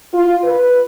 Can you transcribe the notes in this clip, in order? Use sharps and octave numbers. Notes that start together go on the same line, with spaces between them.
F4
B4